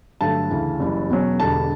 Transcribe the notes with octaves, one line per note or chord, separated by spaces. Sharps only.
G2 D3 F#3 A3 A5
D2 C#3 E3
F#1 F#2 E3 G3
E1 E2 B2 F#3 C#4
E1 E2 D3 G3 D4 A5